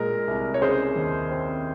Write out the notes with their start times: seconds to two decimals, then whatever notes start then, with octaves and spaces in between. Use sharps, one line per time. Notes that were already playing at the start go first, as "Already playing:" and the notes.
Already playing: A#2 G#3 A#4
0.28 C2
0.54 C#5
0.62 C#3 G#4 C5
0.96 D#2
1.31 C4